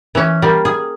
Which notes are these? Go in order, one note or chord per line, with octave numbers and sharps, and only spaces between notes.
E3 C#4
G3 A#3
G#4